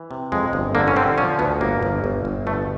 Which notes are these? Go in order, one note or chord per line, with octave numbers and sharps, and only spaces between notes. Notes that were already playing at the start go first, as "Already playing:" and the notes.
Already playing: E3
C3
F2 G#3
G1
D3 A#3
C#4
D3 C4
F3 C#4
D2 B3
G1 A#3
G1
G1
G1
B2 A3